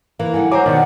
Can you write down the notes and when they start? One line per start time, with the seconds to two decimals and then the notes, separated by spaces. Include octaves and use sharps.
0.20 E3 A#3
0.34 D3 G3 D#4 F#5 G#5
0.52 F#3 C5 G#5 A#5 D6
0.66 B2 D#3 D#4 D5 D#5 F#5